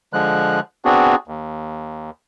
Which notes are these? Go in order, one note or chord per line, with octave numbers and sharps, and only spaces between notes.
D3 F3 G#3 F#6
B3 C4 D4 F#4 G#4
D#2